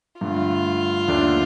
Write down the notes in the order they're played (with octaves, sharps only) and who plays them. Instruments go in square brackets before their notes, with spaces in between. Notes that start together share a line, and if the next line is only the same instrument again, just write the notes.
[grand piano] G2 D3 A3 [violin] F4
[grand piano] D#2 D3 A3 D4